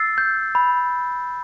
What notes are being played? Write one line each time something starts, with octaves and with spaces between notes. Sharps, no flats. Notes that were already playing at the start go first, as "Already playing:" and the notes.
Already playing: E6 A6 C7
G6
B5